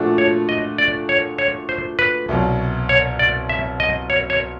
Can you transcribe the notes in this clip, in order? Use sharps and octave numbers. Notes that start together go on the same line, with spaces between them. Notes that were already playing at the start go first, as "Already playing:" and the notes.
Already playing: A#2 F3 A3 D4 F#4
C#5
D#5
D5
C#5
C#5
C5
B4
C2 B2 F#3
C#5
D5
E5
D#5
C#5
C#5